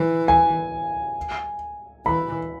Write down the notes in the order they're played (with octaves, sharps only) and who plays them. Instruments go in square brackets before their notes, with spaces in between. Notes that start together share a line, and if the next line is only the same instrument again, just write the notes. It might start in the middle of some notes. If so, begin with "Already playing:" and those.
Already playing: [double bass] E3
[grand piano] G#5
[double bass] E3 [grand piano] B5